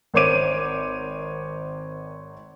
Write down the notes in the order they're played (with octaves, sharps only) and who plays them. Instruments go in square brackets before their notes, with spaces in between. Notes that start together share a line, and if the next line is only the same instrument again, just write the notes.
[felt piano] G#1 A#4 C5 C#5 D6 D#7